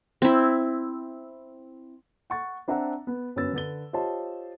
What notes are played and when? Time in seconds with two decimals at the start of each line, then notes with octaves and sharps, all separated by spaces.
0.22 C4 E4
2.30 F#5 C#6 A6
2.68 C4 D4 E5 F#5 A#5
3.07 B3
3.36 G1 F#2 C#4 B4 E6 A6
3.53 D3 B4 A6 G7
3.93 F4 G4 C5 C#5 D#5 A5